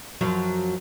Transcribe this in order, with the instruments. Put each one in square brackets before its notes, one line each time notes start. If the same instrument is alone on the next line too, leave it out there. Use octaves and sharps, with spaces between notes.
[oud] F#2 F3 F#3